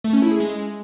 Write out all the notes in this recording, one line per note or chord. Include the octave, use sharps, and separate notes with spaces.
A3
C#4
E4
G#4
G#3